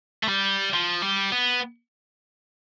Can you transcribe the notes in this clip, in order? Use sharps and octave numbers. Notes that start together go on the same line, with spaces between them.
A3
G3
F3
G3
B3